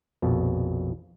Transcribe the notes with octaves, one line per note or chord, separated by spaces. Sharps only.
A#1 F2 B2